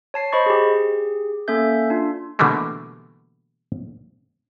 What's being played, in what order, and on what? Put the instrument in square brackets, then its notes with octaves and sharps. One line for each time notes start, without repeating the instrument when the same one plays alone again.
[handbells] C#5 A5 C7
C5 D#5 B5 C#6 A6
G4 G#4
A#3 C#4 A4 E5 G6
D4 F4
[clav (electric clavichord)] B2 D3 E3 G3 A3 A#3